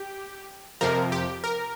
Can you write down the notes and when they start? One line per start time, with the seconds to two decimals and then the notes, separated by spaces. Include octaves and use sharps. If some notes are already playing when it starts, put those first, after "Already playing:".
Already playing: G4
0.81 F2 C3 F3 A#4
1.12 G4
1.44 A#4